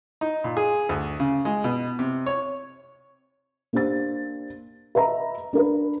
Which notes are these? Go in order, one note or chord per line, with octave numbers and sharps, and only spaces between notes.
D#4
A#2
G#4
D2
C#3
G#3
B2
C3
C#5
A#3 D4 G4 C5 A6
B4 D#5 E5 A#5
D4 A#4 B4